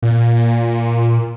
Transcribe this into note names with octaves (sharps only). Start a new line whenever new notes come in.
A#2